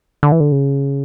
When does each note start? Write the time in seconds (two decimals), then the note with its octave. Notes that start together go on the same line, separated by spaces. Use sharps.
0.23 D3
0.32 E3
0.40 D3
0.52 C#3